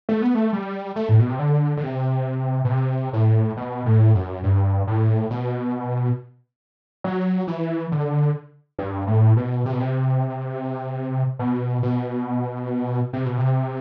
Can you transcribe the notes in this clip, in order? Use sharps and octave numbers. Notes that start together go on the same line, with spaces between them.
A3
B3
A3
G3
A3
A2
B2
C3
D3
D3
C3
B2
C3
A2
B2
A2
F#2
G2
A2
B2
F#3
E3
D3
G2
A2
B2
C3
B2
C3
B2
B2
C3
B2
C3